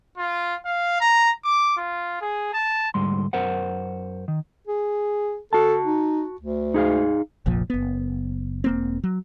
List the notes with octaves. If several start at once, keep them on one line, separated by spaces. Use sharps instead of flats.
F4
F5
A#5
D6
F4
G#4
A5
D2 G#2 G3 C6
F#2 A#4 C5 F#5
D#3
G#4
F#4 A4 A5
D#4
D2
D#4 G#4 F5
F1 A#1 A#2 F3
F#1 B3
E1 A#3 C4
F#3